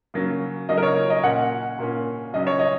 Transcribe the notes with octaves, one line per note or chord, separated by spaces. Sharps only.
C#3 F#3 A#3 C#4
C#3 F#3 A#3 C#4 D#5
A#4
C#5
D#5
A#2 A#3 C#4 F#5
A#2 A#3 C#4
C#3 F#3 C#4 D#5
C#5
D#5